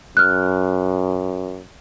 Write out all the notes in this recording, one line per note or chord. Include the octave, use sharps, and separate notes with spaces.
F#2 F6 F#6